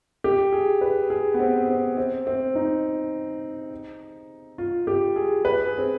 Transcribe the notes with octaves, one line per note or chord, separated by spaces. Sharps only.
G4
G#4
B4
G#4
B3
C4
C4
C4
C4
D#4
F4
G4
G#4
B4
G#4
C4